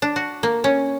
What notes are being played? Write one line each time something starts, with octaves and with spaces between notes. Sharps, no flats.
D4
F#4
A#3
C#4